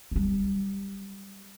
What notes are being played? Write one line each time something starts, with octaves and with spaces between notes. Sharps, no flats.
F#3 G3